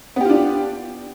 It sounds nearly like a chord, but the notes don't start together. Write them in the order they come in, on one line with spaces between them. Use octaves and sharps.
B3 G4 F4 D4